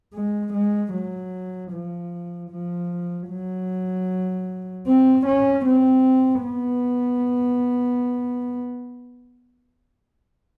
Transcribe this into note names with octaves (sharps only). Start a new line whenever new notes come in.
G#3
G#3
F#3
F3
F3
F#3
C4
C#4
C4
B3